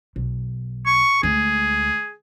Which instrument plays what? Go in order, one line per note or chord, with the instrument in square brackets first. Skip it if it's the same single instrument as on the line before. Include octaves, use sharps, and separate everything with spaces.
[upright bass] B1
[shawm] C#6
[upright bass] D2 G#3 [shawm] G#4